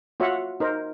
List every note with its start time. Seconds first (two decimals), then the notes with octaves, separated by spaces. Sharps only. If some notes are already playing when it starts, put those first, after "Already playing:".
0.20 F4 F#4 C#5 E5 F#5
0.60 D#4 A#4 C5